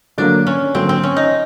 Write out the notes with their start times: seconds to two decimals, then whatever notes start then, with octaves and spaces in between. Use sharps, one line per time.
0.18 D3 F#3 A#3 D4
0.47 C#4
0.75 D3 F#3 A#3 C4
0.89 C4
1.04 C#4
1.17 D#4